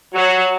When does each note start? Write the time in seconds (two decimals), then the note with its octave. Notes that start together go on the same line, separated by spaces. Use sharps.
0.14 F#3